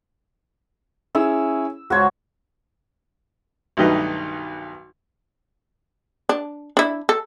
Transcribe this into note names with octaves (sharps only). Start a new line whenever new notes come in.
C#4 E4 G#4 E6
C#2 F#4 C5 C#5
B1 G2 D#3 A3 D#4 B4
D4
D4 E4
A4